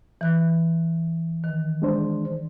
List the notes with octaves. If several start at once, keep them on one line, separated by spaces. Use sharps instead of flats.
E3 F#6
D#3
G#3 D4 C5